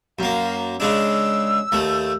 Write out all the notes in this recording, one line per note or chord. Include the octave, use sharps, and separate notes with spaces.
F#2 A#3 F5
C#3 G#3 D4 E6
D#2 A3